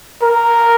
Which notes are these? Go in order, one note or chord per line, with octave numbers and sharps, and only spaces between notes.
A#4